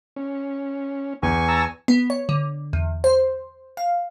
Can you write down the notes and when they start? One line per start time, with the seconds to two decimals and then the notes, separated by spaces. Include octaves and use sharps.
0.16 C#4
1.23 E2 G#5 C#6
1.48 A5 A#5 E6
1.88 B3
2.10 C#5
2.29 D3
2.73 E2
3.04 C5
3.77 F5